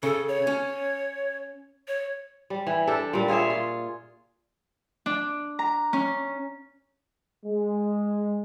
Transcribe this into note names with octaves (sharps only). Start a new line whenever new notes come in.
C#3 A4
C#5
C#4
C#5
G3
E3
D4 G4 A4
A#2 G3
F4 G#4 C#5 E5
F4
D4
A#5
C#4
G#3